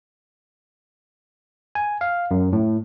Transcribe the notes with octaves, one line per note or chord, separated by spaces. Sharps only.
G#5
F5
F#2
A2